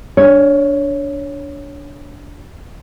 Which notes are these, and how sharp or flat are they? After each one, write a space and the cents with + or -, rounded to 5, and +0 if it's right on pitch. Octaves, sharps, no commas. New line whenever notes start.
D4 -15 C#5 +0